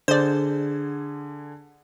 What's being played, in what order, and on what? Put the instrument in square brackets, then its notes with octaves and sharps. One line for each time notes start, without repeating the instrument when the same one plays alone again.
[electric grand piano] D3 G#4 [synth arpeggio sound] C5 D5